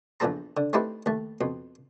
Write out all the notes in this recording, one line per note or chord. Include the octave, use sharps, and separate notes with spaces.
A#1 E2 F3 B3 A4 A#5
D3
A3 C4 D#4 E4 G4 B4
D#2 A3
F2 B2